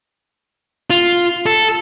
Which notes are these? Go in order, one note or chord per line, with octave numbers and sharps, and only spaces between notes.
F4
A4